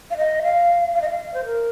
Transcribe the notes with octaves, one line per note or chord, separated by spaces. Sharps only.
F5
D#5
F5
F5
D#5
F5
C5
A#4